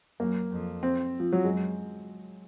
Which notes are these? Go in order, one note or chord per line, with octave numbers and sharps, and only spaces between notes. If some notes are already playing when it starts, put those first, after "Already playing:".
F#2 A#3
F2
C4
F3
F#3
F#2 G#3